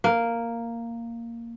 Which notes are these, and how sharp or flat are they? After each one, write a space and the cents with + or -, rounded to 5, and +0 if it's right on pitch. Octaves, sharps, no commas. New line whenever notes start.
A#3 -5